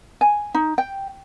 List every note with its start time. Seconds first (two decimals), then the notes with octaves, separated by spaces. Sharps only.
0.21 G#5
0.54 D#4
0.78 G5